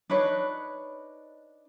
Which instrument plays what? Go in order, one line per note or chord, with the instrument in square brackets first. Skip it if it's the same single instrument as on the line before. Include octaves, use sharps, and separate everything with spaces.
[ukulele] D4 D#4 B4 C#5